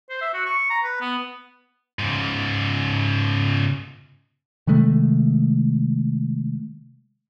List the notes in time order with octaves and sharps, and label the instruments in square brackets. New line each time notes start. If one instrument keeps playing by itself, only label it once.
[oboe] C5
E5
F#4
C#6
A#5
B4
B3
[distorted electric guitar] G#2 C#3
[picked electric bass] C3 D#3 G#3 A3